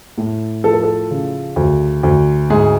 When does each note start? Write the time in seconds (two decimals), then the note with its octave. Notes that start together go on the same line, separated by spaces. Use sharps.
0.18 A2
0.64 F3 A4
0.73 A#4
0.83 A4
1.11 C#3
1.56 D2
2.03 D2
2.50 G#2 G#4